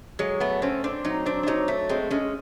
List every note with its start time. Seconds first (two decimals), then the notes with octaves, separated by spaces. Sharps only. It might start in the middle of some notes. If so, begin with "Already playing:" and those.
0.19 F#3 G#3
0.40 A3 B3
0.62 C4 C#4
0.84 C4 D4
1.05 F#3 D#4
1.26 C4 D4
1.43 D4
1.47 F#3 D#4
1.68 A3
1.89 G#3 C4
2.10 G#3 C#4